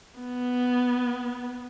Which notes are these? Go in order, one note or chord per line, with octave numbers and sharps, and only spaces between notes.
B3